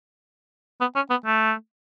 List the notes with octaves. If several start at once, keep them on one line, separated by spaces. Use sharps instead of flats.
B3
C#4
B3
A3